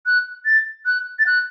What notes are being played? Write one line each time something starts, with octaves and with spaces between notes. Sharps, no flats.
F#6
A6
F#6
A6
F#6